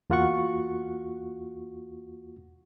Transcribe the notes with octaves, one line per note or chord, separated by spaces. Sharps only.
E2 A#3 F4 F#4 F#5 C#6